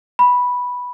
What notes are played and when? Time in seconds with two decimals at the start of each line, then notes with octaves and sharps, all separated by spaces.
0.19 B5